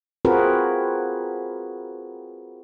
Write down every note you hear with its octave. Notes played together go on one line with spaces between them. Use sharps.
C4 F4 F#4 G#4 A#4 B4